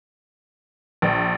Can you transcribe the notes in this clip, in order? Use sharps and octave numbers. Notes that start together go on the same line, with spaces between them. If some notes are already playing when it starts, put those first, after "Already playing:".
A#1